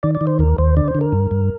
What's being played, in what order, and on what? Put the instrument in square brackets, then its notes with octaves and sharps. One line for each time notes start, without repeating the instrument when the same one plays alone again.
[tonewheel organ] D#3 D5
D5
D#3
C5
D#2 A#4
D#2 C5
D3 D5
C5
D3
A#4
G2
G2